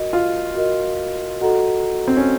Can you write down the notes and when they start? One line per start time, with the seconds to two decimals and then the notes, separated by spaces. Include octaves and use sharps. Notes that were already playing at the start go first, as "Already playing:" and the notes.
Already playing: F#4 A#4 D#5
0.13 F4
0.55 F#4 A#4 D#5
1.41 F#4 A4 D#5 F#5 A#5
2.08 C4
2.17 C#4